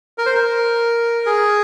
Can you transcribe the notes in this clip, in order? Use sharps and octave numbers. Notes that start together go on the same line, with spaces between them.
A#4
C5
A#4
G#4